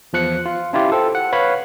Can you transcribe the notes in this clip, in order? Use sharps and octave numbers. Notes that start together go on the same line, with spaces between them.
E2 F3 F#6 C#7
F4
C#4 E4 F4 G4
A4 C5 G5
F#5
B4 C#5 F5 B5